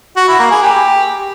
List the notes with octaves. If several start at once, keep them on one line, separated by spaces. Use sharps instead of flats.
F#4
E4
A#3
G#4
G4